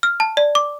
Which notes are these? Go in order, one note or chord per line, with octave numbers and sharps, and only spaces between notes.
F6
A5
D5
D6